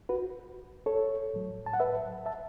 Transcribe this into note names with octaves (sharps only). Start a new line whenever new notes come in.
F#4 B4
A4 C#5
A2 F#3
A5
F#5
B4 E5
E5 A5